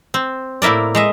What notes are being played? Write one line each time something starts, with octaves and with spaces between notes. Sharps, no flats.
C4
A2 A#3 E4 A#4 D5
G#3 D#5 E5